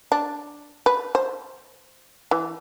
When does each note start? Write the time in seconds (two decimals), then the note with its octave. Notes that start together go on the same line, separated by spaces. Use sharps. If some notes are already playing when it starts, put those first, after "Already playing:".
0.12 D4
0.86 B4
1.15 C5
2.31 E3